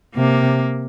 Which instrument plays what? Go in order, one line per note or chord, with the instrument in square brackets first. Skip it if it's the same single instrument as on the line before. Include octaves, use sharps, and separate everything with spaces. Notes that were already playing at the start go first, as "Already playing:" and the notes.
[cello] C3 [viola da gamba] A#3